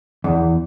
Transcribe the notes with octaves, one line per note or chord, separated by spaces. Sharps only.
E2